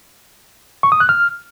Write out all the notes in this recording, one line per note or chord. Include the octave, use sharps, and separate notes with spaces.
C#6
D#6
F#6
F6